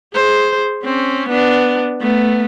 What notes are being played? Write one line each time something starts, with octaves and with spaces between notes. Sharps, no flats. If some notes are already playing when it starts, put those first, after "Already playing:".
G#4 C5
C4 C#4
B3 D4
A3 B3